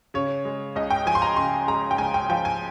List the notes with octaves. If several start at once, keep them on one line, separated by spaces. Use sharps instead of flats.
C#3 C#5
G#3
C#2 D#5
G5
F3 G#5
C6
A#5
C#3 C6
G#3 A#5
G5
C#2 G#5
G5
F3 G5
G#5